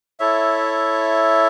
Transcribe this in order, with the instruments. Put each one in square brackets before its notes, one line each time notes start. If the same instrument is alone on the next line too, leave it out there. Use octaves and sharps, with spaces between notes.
[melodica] E4 A4 C#5 E5